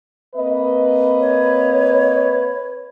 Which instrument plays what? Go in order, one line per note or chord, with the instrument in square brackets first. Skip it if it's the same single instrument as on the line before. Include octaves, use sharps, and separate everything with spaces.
[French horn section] A#3 C4 D#5 [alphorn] B4
[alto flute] C#5